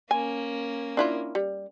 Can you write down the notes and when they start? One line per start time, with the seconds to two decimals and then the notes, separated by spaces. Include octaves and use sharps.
0.11 A#3 C#4 G#5
0.97 D4 E4 F4
1.35 G3